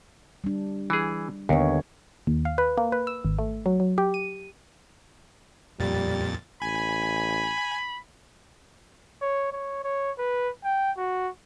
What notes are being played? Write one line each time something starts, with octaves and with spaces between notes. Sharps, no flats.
G3 D4
E3 G#4
D#2 D3 B3 C#5
D#2
F5
B4
A#3
B4
E6
G#1
A3
F#3
F#3
G4
D#7
F2 A#2 G3 A6
A1 G#5 B5
C#5
C#5
C#5
B4
G5
F#4